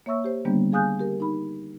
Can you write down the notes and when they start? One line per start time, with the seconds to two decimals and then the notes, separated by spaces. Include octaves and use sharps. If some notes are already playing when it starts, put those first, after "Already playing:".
0.06 A#3 C#5 E5 C#6 E6
0.24 G4 C5
0.45 D3 D#3 G3 A#3 B3 D4
0.72 G#4 F5 G#5 D#6 F#6 G6
0.99 G4 A#4
1.20 D#4 B5